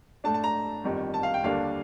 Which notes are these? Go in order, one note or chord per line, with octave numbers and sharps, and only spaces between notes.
A2 A3 D4 A5
A5
A#5
G1 F2 D#3 G3
A5
F5
G5
D#2 D3 G3 A#3 D4 F5